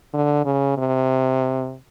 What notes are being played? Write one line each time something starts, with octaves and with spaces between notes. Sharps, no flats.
D3
C#3
C3